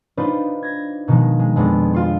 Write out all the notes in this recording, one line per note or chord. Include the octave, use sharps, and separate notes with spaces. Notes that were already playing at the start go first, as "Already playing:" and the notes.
D4 D#4 F4 B4 C5
G#6 A#6
B2 D#3 F3 G#3
G#3
F2 G#3 B3 D4
F4 C6